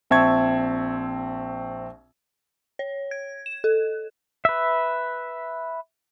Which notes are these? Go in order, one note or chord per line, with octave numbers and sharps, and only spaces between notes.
A#1 C4 E5 A5 C#6 G#6
C#5
G#6
E7
A4
B4 E5